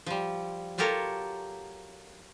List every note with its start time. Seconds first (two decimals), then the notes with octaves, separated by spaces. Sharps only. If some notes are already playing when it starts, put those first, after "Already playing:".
0.06 F3 G3
0.78 F#3 F4 G4 A4 A#4 C#5